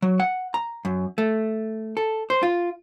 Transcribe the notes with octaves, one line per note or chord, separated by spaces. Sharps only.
F#3
F#5
A#5
F#2
A3
A4
C5
F4